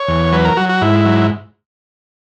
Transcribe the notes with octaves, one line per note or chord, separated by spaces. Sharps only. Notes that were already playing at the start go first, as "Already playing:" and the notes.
Already playing: C#5
E2
F#3 B4
A#4
F#3 F#4
F#4
G#2 E4
F#3